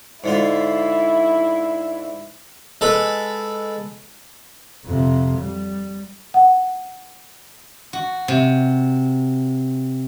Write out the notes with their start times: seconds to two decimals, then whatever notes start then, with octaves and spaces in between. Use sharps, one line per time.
0.24 G#2 D3 E4 F4
2.81 G#3 A4 B4
4.85 F2 C3
5.38 G3
6.34 F#5
7.93 F#4
8.28 C3